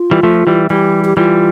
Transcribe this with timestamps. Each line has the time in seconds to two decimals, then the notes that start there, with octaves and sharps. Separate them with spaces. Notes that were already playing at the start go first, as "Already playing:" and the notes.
Already playing: F4
0.11 E3 G3
0.23 F3 A3
0.47 E3 G3
0.70 E3 G3 G4
1.05 G4
1.17 E3 G3 F4